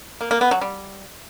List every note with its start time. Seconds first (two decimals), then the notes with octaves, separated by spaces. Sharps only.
0.21 A#3
0.31 A#3
0.41 B3
0.51 F#3
0.61 G3